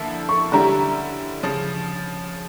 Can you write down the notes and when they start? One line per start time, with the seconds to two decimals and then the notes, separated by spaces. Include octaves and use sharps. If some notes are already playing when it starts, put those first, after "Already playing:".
Already playing: D3 F3 A#3 E4 A4
0.29 C#6
0.52 D3 G3 C#4 E4 G4 A#5
1.43 C#3 F3 C#4